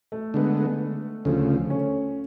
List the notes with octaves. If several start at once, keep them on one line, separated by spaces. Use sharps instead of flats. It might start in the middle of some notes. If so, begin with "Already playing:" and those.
A3
D3 G#3 B3
D2 C#3 F3 A3
C#4